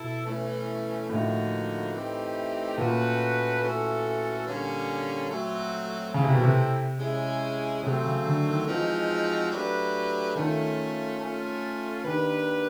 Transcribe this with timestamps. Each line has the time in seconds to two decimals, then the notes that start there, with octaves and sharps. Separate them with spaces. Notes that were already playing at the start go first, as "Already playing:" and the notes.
Already playing: B2 E4 A4
0.25 E3 A3 C#4
1.09 A2 D3 F3 A#3 D#4 F#4
1.93 E3 A3 C4 D#4 G4
2.78 A#2 A3 C#4 F#4 B4
3.62 E3 A3 C#4 F#4 A4
4.46 D3 G3 A#3 C#4
5.30 F#3 A3 C4
6.14 C#3 A3 C4 E4
6.24 C3
6.34 B2
6.44 C3
6.98 G#3 C#4 E4 G#4
7.83 C3 F#3 A3 C4
8.04 C#3
8.25 D3
8.46 D#3
8.66 E3 F3 G#3 C4 D#4 F#4
9.51 F#3 A3 D4 G4 B4
10.35 D#3 A3 C#4 F4
11.20 A3 C#4 F4
12.04 D#3 A#3 D4 G4 B4